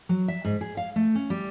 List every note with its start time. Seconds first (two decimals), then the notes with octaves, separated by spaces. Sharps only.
0.09 F#3
0.28 E5
0.45 G#2
0.61 G#4
0.77 F5
0.96 A3
1.15 C#4
1.30 G3